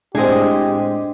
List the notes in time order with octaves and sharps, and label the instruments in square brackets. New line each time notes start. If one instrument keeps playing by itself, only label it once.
[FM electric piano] A2 C4 [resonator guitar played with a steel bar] G#3 G#4 [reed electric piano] D4 D#5 [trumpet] G4